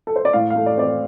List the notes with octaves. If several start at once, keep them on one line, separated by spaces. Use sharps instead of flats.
A4
C5
D5
A2 F5
F5
A3
D5
C4 D5
C5